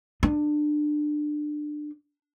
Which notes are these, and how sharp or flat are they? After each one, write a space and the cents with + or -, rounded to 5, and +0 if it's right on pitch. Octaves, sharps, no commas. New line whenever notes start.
D4 +25